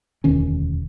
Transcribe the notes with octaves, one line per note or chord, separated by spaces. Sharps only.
E1 D2 D#3 C#4